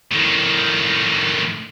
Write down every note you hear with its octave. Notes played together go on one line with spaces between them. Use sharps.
A2 D#3